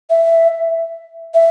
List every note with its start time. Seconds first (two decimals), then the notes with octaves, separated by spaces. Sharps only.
0.10 E5
1.34 E5